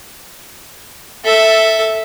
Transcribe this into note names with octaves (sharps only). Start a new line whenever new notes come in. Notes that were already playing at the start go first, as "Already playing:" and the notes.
A4 E5